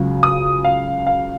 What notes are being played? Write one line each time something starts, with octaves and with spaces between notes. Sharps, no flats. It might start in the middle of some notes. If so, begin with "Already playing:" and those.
Already playing: C#2 C#3 F#3
D#6
F5
F5